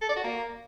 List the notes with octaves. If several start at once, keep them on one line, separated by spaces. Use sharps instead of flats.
A4
D5
F#4
A#3